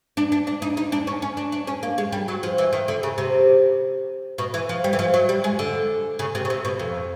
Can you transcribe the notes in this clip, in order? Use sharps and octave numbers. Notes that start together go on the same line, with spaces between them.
D4
D4
D4
D#4
D#4
D4
C#4
C#4
D4
D4
C#4
A#3
G#3
G3
F#3
F3
E3
D#3
D3
C#3
C3
B2
E3
F3
G3
E3
F3
F#3
G3
G#3
D3
C#3
C3
C#3
C3
B2
F2